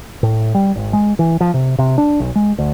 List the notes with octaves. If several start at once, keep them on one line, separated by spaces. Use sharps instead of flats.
A2
G3
G#1
G#3
E3
F3
C3
C3
D4
B1
G#3
D2